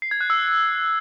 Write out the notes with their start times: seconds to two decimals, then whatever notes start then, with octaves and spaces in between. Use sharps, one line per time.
0.02 C7
0.11 G#6
0.21 F#6
0.30 E6